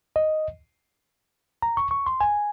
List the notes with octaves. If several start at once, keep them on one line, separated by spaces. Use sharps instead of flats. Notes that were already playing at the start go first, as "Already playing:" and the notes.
D#5
A#5
C#6
C#6
C6
G#5